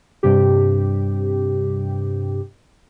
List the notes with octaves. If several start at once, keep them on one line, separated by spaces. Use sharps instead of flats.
G2 C3 G4